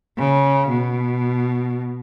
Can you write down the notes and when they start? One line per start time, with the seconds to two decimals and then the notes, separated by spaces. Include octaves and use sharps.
0.18 C#3
0.70 B2